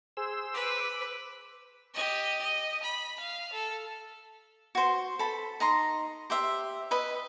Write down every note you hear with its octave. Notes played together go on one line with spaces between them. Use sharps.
G#4 C5 E6
B4 D6
G4 D#5
D#5
B5
F5
A4
F#4 C5
A4 B5
D#4 A#5 C6
G4 C5 E5
B4 D#5 B5